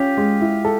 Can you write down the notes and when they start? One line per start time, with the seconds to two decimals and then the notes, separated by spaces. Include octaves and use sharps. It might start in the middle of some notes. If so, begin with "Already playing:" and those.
Already playing: C#4 F4 G4
0.17 G#3
0.41 E4
0.64 A4